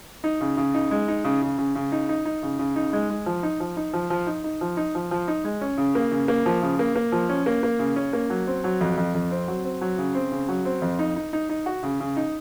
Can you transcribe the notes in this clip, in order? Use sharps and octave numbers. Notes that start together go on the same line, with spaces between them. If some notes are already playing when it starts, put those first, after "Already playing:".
D#4
C#3
C#3
D#4
G#3
D#4
C#3
C#3
C#3
C#3
D#4
D#4
D#4
C#3
C#3
D#4
G#3
G#3
F3
D#4
F3
D#4
F3
F3
D#4
D#4
F3
D#4
F3
F3
D#4
G#3
C#4
C#3
A#3
C#3
A#3
F3
C#3
A#3
A#3
F3
C#4
A#3
A#3
C#3
C#4
A#3
F#3
C4
F#3
F2
F2
F2
C4
F#3
C4
F#3
C#3
C4
C#3
F#3
C4
F2
D#4
D#4
D#4
D#4
F#4
C#3
C#3
D#4